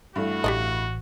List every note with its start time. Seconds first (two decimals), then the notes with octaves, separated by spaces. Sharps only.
0.16 G2 E3 A3 F#4
0.44 A1 G4 D5 D#5